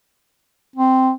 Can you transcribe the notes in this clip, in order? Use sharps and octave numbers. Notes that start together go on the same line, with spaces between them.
C4